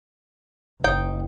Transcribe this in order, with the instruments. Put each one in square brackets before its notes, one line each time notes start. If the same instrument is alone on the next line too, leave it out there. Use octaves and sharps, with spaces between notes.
[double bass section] F#1 [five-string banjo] D#4 G5